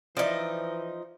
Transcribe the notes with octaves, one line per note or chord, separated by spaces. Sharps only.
E3 F3 D#4 C5 D5 E5